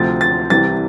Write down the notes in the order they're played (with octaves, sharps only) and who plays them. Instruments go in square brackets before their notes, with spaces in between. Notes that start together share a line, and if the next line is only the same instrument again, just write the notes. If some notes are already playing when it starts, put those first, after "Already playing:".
Already playing: [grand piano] D2 C3 F3 A6
A6
C2 C3 E3 G3 A6